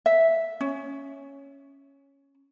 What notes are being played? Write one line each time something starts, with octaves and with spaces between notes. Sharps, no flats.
E5
C#4